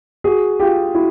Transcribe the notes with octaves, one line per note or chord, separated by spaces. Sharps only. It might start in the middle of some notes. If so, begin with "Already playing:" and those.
F#4 G#4
F4 G4
E4 F#4